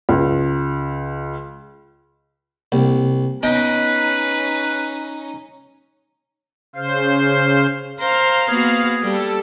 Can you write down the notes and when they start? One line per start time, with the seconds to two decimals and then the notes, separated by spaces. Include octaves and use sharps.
0.09 C#2
2.72 C2 A#3
3.43 B3 C#4 D#4 B4 D#5 G5
6.75 C#3 C5 F5
8.00 A#4 C5 F5
8.48 A#3 B3 F#4 G#4
9.02 G3 A4